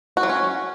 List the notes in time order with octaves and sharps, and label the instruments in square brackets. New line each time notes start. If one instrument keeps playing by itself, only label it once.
[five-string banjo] F#4
F#3
C#4